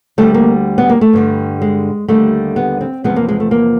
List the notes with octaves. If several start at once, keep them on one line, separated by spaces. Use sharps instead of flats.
D2 D3 G3 A3
A#3
B3
A#3
A3
G2 D3 G3
G#3
D#2 D3 G3 A3
B3
C4
E2 C3 F3 G#3 B3
A#3
G#3
A3
A#3